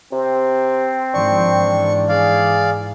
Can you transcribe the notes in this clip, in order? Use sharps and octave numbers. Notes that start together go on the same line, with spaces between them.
C3 C4
G#2 D#3 F3 D4 C#6
G#2 E3
G#4 D5 F5